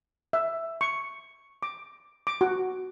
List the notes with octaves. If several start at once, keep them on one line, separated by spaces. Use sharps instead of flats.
E5
C#6
D6
D6
F#4